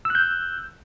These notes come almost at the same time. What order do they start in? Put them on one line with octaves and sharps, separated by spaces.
E6 F#6 G6